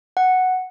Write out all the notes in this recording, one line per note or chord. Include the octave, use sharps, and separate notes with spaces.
F#5